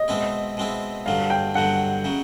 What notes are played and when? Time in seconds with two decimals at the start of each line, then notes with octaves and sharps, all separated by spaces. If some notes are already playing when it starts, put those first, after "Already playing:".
Already playing: D#5
0.08 B2 G#3 C4 E4
0.57 B2 G#3 C4 E4
1.06 G2 D3 F#3 F5
1.30 G5
1.55 G2 D3 F#3 F#5
2.04 C#3 F#3